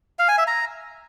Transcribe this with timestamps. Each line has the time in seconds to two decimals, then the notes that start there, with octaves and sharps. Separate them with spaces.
0.19 F5
0.28 G#5
0.38 E5
0.47 A#5